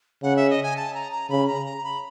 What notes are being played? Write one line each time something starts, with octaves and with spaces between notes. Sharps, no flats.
C#3 F#5
E5
D#5
G#5
A5
A#5
A#5
C#3 B5
A#5
A#5
B5